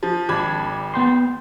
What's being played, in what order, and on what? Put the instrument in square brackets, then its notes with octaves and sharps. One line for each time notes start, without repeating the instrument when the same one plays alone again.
[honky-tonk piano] F3
[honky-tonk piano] G#1 B5 G#6 [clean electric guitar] D4
[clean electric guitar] B3 G5 C6